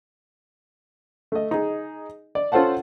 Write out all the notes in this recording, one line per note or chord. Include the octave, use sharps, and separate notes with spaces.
A3 D#5
D#4 G#4
D5
C#4 F4 A4 C5 F#5 A5